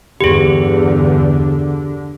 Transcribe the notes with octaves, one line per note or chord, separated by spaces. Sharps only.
E2 G2 D3 G4 G#4